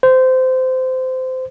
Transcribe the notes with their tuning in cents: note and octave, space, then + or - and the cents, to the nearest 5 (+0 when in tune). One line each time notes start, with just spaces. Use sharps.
C5 -20